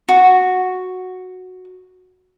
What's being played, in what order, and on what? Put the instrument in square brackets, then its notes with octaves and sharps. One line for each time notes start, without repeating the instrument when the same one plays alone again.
[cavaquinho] F#4